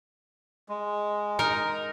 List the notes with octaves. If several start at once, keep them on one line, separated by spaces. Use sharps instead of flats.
G#3
D#4 A#4